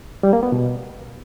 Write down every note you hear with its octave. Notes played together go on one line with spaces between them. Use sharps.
G3
A#3
B3
B2